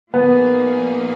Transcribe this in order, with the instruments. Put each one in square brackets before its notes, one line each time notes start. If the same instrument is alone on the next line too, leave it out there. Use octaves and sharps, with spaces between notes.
[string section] A#2 F3 A#3 D#4 G#4 [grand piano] B3